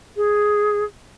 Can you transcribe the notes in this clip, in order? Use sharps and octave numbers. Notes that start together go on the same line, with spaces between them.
G#4